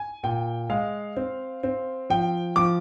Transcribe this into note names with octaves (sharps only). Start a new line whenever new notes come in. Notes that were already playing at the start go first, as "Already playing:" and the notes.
Already playing: G#5
A#2 G5
G#3 F5
C4
C4
F3 G5
F3 D6